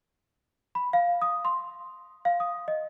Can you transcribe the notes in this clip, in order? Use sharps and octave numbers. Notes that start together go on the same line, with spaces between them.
B5
F5
D#6
C6
F5
D#6
D#5